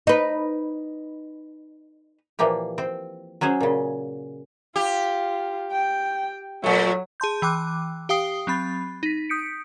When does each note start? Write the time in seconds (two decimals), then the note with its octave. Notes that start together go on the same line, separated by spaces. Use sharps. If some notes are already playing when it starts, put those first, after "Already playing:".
0.07 D#4 B4
2.39 A#2 E3 F3 A#3 G4
2.78 C4
3.41 F#3 C#4 G#4 C5
3.61 A#2 C#3
4.76 F4 G4
5.72 G5
6.64 A#2 F#3 A3
7.20 G#4 A5 C6 G6
7.42 E3 G5 D6 F#6
8.09 G4 F5 G5 D#6 C7 G7
8.47 F#3 C4 B5 A6
9.03 D#4 B6
9.29 D#6 G6 B6 C#7 D7